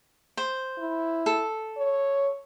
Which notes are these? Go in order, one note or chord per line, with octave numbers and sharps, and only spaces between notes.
C5
E4
A4
C#5